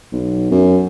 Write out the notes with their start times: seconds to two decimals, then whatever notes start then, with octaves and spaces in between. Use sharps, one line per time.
0.12 B1
0.51 F#2